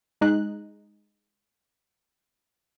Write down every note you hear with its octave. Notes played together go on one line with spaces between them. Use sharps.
G#3 D#4 F#6